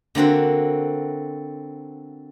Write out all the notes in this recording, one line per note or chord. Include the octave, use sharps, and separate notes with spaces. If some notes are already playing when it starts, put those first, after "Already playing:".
D3 A#3 C4 F#4